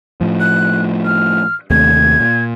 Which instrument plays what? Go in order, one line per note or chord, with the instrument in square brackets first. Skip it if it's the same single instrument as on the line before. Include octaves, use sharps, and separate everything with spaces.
[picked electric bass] A2 F3
[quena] F#6
F6
[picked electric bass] D#2 C3 A3 [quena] G#6
[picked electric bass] A#2